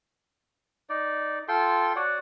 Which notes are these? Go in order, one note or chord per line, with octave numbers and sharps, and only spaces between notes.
D#4 D5
F4 A4 G5 C6
F#4 C#5 D5 F#5